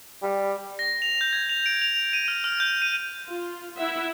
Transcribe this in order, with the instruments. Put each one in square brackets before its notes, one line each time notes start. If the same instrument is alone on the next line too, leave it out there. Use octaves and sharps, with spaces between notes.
[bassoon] G3
[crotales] A#6
F7
G6
G#6
F7
D7
F7
D#7
F6
F6
G6
D#7
[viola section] F4
E4 E5 F#5